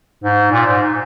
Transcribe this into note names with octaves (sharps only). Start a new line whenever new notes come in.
G#2
A#2
G#2